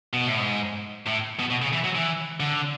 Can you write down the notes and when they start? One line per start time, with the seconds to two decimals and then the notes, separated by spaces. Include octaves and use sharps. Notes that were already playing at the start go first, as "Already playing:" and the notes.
0.13 B2
0.27 A2
0.39 G#2
1.06 A2
1.39 B2
1.50 B2
1.62 C#3
1.73 E3
1.84 F#3
1.96 E3
2.40 D3